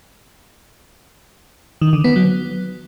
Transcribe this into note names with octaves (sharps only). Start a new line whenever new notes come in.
D#3
D3
B3
F#3